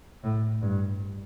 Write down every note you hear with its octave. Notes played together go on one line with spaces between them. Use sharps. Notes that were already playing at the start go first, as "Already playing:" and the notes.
A2
G2